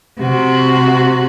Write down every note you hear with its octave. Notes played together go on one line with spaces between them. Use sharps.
C3 F#4